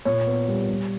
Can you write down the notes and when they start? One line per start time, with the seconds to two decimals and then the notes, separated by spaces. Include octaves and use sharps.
0.05 A#2 C#5
0.26 B3
0.48 G3
0.68 G3